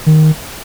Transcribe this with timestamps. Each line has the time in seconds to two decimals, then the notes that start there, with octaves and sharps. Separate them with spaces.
0.06 D#3